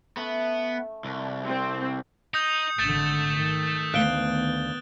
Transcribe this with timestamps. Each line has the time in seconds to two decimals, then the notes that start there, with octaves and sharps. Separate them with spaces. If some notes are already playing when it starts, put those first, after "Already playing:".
0.17 A3 B3 C#4
1.05 C2
1.45 C4
2.34 D#4 D#6 G6 F7
2.79 G#1 D3 A3 G6 A6 E7
3.37 D#3
3.94 D2 D#3 B3 F5 F#6 D7 G7